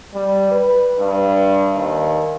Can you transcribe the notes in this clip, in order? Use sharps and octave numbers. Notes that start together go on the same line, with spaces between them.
G3
B4
G2
D#2